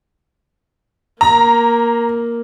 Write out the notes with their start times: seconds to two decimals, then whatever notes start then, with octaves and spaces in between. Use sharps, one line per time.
1.21 A#3 A#5